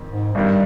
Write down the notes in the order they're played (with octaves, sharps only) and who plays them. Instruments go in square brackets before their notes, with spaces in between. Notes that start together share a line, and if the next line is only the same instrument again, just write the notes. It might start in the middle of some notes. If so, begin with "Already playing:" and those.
Already playing: [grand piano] F2 D#3
[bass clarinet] G#2
[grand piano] G#1 G2 D#3 [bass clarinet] G3